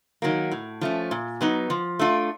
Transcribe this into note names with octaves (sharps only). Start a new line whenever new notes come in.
D#3 F#3 A#3
A2
F3 A3 C#4
A#2
F#3 B3 D#4
F3
A3 D4 F4